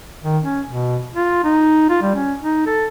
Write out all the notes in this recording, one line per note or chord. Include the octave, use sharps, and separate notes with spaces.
D#3
C#4
B2
F4
D#4
F4
G3
C#4
D#4
A4